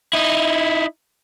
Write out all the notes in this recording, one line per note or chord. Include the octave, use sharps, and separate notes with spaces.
D#4 E4